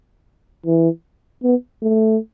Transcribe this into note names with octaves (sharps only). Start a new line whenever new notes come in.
E3
B3
A3